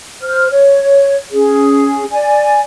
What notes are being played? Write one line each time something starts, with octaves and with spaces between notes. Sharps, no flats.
C5 F6
C#5
C#4 G#4
D5 G#5